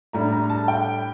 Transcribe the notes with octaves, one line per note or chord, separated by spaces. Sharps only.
A2 G3 D4 A#5
A#5
A5
G5